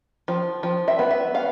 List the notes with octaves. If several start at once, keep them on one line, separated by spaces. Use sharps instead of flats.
F3
F3
E5
B3
E5
B3 F5